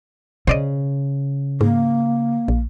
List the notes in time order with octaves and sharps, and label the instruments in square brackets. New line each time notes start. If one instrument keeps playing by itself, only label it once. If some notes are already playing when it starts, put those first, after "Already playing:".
[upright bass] C#3 [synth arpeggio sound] C5 D5 D#5
[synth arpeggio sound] G#2 [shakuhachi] A#3
[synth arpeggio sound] A#1